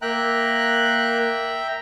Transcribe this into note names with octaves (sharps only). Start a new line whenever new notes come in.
A#3 E5 G5 A#5 F#6